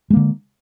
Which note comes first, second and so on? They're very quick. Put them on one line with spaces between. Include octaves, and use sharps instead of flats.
G#3 A#3 D3